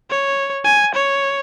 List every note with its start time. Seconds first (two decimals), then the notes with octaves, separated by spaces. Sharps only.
0.10 C#5
0.65 G#5
0.95 C#5